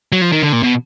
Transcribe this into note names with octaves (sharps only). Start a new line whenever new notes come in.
F#3
F3
D#3
D3
A#2
B2